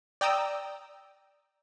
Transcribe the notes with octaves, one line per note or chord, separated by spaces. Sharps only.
D5 G5 A#5 D#6 E6